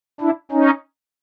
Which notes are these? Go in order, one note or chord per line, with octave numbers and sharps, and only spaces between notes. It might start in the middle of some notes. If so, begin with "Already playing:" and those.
D4 E4
C#4 D#4